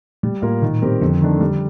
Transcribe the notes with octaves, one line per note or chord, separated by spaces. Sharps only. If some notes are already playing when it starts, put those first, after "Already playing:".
A#2 G3
A2 A#3 F4 A#4
A#2 D#3
G3 C4 G4 A#4
F2 D3 F3
D#3 A3 D4
G3